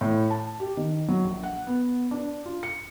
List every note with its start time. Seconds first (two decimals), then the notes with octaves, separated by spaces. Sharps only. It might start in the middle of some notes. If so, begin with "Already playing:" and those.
0.01 A2
0.30 A5
0.60 G4
0.77 D#3
1.08 F#3
1.24 A#1
1.43 F#5
1.67 B3
2.11 D4
2.46 F4
2.63 C#7